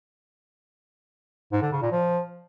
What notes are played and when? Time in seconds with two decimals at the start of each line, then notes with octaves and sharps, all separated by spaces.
1.52 G#2
1.62 D3
1.72 C#3
1.82 A#2
1.92 F3